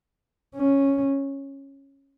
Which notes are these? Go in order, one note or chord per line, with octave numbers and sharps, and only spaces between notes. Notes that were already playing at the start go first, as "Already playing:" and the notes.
C#4